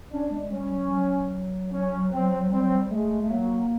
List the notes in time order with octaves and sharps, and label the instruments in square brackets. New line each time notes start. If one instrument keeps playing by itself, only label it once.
[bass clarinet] C#4 [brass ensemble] D4
[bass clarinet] G#3
[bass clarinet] G3 [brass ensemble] C#4
[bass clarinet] F#3
F#3
[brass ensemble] C#4
C4
[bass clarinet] G3 [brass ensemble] C4
[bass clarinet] F#3
G3
[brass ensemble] G#3 [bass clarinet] A3
[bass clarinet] A3
[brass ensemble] F#3 [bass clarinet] A#3